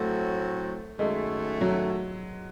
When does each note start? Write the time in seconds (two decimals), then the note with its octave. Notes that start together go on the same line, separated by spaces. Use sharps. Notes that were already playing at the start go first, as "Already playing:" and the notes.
Already playing: A2 F#3 A3 C4 F#4
0.99 F#2 D#3 G#3 A3
1.61 F#3